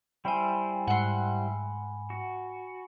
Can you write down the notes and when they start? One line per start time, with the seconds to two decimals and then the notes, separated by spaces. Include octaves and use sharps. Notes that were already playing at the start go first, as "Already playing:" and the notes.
0.25 G3 E4 C5 G5 G#5 B5
0.87 G#2 F#5 C6
2.10 F#4